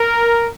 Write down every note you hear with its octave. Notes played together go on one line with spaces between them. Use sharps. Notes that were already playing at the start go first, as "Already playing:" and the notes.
Already playing: A#4